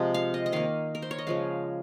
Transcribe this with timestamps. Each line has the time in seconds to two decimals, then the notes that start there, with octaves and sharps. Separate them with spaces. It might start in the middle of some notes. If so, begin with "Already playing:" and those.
Already playing: C3 F3 G#3
0.14 F5
0.34 D#5
0.46 D#5
0.52 D#3 A#3 F5
0.95 A#4
1.02 C5
1.11 C#5
1.19 D#5
1.27 C#3 F3 G#3 F5